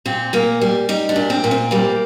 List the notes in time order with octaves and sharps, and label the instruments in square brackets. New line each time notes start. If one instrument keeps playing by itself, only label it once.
[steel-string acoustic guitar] A#2 C4
A#2 A#3
G3
G3 D#4
D4
A#2
C4
A#2
C4
G3 A#3